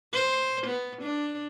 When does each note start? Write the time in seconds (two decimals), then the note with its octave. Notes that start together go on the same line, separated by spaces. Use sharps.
0.14 C5
0.67 B3
1.03 D4